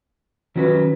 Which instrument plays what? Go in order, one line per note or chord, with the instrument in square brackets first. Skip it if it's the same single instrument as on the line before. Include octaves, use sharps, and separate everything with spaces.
[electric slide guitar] D#3 F#3 C#4 F#4 B4